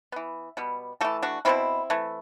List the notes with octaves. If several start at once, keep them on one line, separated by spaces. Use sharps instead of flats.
E3 B3
B2 G3 B3
E3 A3 F#4 A4
D4 F#4
B2 F#3 B3 C4 E4
E3 A3